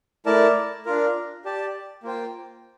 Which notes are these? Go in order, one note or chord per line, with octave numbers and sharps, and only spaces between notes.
A3 E4 A#4 D5 A5
D4 F4 A#4
G4 D5 A5
A#3 F4 C5 G5